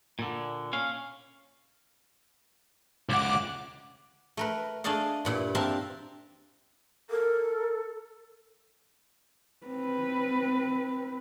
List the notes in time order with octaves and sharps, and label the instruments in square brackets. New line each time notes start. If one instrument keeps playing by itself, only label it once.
[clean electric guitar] A#2 D3
C#4 F5
[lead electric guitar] C#2 F#5 [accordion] D6
[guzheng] A3 A#4 B4
A3 D4 G#4 D5 D#5 F5
G2 A#2 E4
C4 D4 A#4 E5 F5 A5
[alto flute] A4 [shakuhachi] A#4
[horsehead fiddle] C4 B4